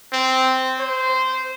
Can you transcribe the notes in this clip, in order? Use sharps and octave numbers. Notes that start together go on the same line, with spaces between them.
C4
C5